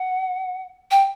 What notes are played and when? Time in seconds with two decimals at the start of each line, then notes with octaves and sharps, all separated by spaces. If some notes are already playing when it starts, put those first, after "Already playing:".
Already playing: F#5
0.91 G5